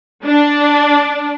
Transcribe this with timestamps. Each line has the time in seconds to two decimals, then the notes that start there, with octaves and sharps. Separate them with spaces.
0.24 D4